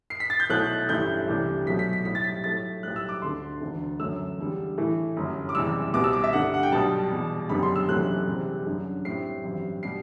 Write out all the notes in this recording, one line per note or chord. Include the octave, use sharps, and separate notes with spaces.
C7
B6
A6
G6
B1 B2 F#3 A3 E4 F#6
A1 G2 E3 A3 E4 G6
C2 C3 E3 A3 D4
B1 B2 F#3 A3 B6
B6
B6
B1 A2 G3 B6
A6
B6
A2 F#3 A3 E4 A6
B1 A2 G3 F#6
E6
D6
D2 D3 A3 C6
E1 D2 D3
G1 F#2 F#3 A3 E6
E2 D3 G3
A2 E3 A3 E4
G1 F#2 F#3
D6
F#1 E2 C3 E3 G3 E6
C2 B2 G3 B3 D6
E6
D6
E5
G2 D3 A3 D4 F#5
F#5
G5
B1 B2 G3 B3 A5
E2 B2 G3
F#1 F#2 D3 G3 B3 B5
C6
E6
F#1 E2 C3 F#3 A3 F#6
E2 C3 G3 C4
G1 F#2 D3
A2 G3 C4 C7
A1 G2 F#3 C4
B2 G3 C7